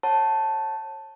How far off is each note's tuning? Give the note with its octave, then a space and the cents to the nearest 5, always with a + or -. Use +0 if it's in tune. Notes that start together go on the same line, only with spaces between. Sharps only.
C#5 -35 F#5 +0 A5 +0